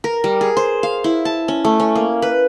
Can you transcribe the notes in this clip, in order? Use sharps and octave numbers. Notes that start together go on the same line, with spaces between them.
A#4
G3
G#4
C5
F5
E4
A5
C#4
A3
C#4
A#3
B4